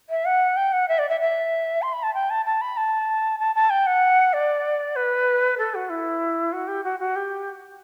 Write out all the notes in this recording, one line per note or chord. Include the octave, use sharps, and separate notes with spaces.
E5
F#5
G5
F#5
E5
D5
E5
E5
C6
B5
A5
G5
A5
A5
B5
A5
A5
A5
G5
F#5
D5
B4
A4
F#4
E4
F#4
G4
F#4
F#4
G4